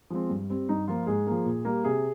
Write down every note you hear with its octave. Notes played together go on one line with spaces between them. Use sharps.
F3 G#3 C4
G2
G3 C4
G2 D#4
F3 A#3 F4
G#2 G#4
F3 A#3
A#2
G3 A#3
C3 G#4